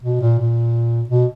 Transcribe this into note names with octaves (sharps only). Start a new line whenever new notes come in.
B2
A#2
A#2
B2